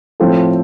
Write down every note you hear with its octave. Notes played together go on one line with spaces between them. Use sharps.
A2 F3 C4 F4 A4